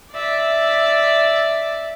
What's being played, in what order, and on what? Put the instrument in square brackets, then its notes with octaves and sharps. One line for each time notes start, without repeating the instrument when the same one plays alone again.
[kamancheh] D5 E5